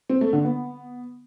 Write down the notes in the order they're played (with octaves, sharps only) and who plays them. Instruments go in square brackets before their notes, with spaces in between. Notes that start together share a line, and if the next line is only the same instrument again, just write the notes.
[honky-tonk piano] C4
A3
D3
B3